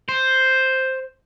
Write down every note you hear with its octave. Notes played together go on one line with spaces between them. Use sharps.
C5